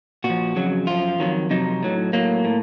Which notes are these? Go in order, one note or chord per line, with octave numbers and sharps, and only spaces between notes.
A#2 F#4
F3
F2 C#3 F#3
F#2 F3 F4
F2 D#3 F#3
F2 C3 F#3 D#4
A2 F#3
A2 F#3 A#3
A2